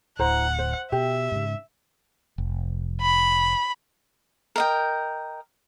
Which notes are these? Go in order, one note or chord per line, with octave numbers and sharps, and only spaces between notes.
D1 D2 E4 C5 F#5 A#5
C5
B2 G4 E5
G#2 C#3
F1
B5
A#4 D#5 G5